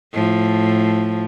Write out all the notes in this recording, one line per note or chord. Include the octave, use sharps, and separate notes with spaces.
A2 F3